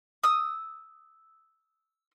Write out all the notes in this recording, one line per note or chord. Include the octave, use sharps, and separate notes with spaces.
D#6 E6